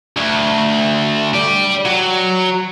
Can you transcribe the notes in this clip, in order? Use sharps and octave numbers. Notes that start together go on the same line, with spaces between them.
D2
G4 D5
F#3